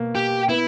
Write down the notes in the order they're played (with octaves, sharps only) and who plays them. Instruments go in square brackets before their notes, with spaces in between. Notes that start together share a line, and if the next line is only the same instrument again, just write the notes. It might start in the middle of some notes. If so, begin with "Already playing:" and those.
Already playing: [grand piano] B2 A#3
[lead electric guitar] G4
[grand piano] B3 [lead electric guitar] E4